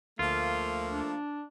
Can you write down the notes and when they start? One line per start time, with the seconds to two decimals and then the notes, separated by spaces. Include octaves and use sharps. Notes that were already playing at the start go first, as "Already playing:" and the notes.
0.19 D2 F3 A3 A#3 F4
0.91 D4